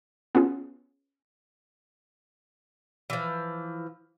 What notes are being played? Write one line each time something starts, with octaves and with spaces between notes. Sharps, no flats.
B3 C#4 F4 G#4
E3 F3